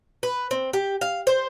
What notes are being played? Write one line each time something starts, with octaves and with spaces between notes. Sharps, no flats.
B4
C4
G4
F5
C5